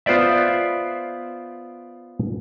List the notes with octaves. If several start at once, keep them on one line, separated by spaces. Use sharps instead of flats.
B3 F4 C5 D5 E5